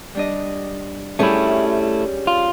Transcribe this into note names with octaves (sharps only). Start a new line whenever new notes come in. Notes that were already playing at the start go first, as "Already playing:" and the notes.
G3 D4 D#5
G3 A3 C#4 E4 G4 G#4
F4